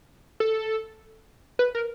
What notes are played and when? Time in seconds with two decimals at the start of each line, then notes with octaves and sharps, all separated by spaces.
0.40 A4
1.59 B4
1.75 A#4